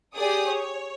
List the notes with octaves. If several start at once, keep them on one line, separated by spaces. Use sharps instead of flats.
G4 G#4 D5 D#6
C#5